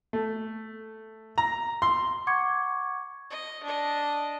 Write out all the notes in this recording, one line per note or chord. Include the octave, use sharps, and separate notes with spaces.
A3
A#5
C6
F#5 C#6 D6 G#6 C#7
D#5
D4 D#5